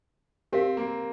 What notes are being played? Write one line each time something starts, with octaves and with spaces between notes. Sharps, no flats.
C4 G4 A#4 F5
A#3